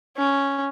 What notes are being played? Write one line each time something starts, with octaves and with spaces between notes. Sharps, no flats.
C#4